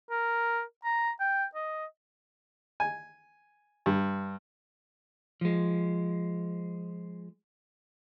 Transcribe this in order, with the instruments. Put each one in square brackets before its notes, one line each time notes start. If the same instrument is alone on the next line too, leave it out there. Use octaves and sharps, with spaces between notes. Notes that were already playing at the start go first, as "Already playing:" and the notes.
[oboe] A#4
A#5
G5
D#5
[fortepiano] G#5
G2
[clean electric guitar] F3 G#3